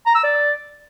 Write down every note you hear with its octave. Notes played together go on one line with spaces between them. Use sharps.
A#5
E6
D5